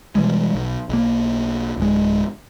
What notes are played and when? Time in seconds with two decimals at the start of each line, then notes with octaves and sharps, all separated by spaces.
0.15 B2 E3 G3 G#3
0.54 B1
0.89 B1 A#3
1.78 D1 G#3